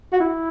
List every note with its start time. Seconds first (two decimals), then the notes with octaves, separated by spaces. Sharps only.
0.12 F#4
0.20 E4